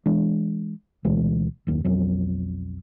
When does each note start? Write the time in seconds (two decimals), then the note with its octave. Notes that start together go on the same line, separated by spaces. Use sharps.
0.06 E3 G#3 D4
1.05 D2 B2 E3 G#3
1.67 F#1 D#2
1.85 B1 F2 F#3